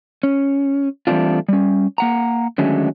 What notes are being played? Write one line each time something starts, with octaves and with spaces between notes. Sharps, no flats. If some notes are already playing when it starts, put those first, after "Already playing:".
C#4
E3 G3 A3 C4 D4 F4
G3 C#4
A#3 F#5 A#5
D3 D#3 F#3 G#3 A3 C#4